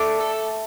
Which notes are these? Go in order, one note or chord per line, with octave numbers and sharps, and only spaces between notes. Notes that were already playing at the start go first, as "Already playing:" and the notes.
Already playing: A3 D4 D6
A4